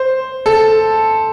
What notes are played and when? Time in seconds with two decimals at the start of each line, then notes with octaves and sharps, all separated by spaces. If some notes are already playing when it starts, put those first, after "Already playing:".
Already playing: C5
0.46 A4